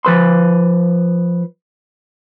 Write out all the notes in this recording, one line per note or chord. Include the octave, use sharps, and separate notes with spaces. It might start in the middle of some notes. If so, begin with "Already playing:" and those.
F3 B4 C6